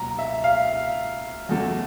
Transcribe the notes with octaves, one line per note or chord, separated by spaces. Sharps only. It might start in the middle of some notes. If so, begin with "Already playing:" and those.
Already playing: C#2 B2 F#3 A#3 A#5
E5
F5
E2 C#3 F#3 A3